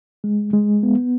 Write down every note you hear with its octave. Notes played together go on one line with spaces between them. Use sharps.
G#3
G#3
B3